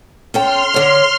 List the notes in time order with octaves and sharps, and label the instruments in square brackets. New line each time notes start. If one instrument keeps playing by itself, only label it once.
[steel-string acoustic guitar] C#4 A4 G5 [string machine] C6 F6
[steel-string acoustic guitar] D3 C#5